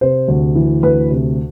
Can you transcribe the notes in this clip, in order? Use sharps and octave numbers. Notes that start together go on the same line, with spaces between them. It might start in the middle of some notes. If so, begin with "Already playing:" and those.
C3 C5
D2
E3
D2 B4
C3